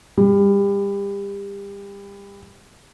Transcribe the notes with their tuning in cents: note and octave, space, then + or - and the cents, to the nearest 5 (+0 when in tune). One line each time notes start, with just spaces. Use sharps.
G3 +30